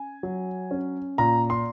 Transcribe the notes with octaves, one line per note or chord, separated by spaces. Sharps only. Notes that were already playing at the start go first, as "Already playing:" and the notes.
Already playing: C#4 G#5
F#3
C#4
A#2 A#5
C6